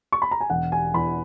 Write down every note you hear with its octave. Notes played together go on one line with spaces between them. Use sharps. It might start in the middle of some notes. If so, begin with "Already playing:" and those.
C#6
B5
A#5
G#5
E1 F#5
G#5
E2 B5